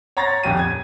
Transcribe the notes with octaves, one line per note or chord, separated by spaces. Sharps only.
C#5 F#5 A#5 C6 A6 A#6
D#1 F2 G4 D#7
G#6